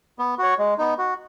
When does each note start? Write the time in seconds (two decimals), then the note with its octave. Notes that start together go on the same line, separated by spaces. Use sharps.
0.19 B3
0.38 F#4 C#5
0.58 G#3
0.78 B3 D#4
0.98 F#4